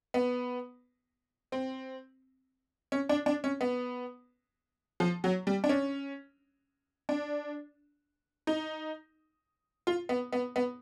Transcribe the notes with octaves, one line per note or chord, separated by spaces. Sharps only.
B3
C4
C#4
D4
D4
C#4
B3
F3
F#3
G3
D4
C#4
D4
D#4
F4
B3
B3
B3